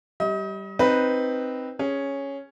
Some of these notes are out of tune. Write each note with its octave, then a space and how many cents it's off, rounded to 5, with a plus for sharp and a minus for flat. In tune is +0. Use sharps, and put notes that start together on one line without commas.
G3 -10 D#5 +35
C4 +0 D#4 +0 B4 +0
C#4 +0 G#4 +0